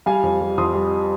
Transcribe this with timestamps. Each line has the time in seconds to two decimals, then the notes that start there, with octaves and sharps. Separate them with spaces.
0.06 G3 F5 G#5
0.23 F2
0.41 G3
0.58 F2 C6 D#6
0.75 G3